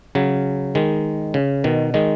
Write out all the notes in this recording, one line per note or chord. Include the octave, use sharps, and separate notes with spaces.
C#3 F#3
D#3 G#3
C#3
B2 D#3
D#3 G#3